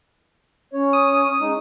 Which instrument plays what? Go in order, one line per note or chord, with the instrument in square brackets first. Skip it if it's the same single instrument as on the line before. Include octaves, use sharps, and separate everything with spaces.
[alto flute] C#4 [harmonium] C#5
[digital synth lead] D#6
[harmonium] G#3 D#4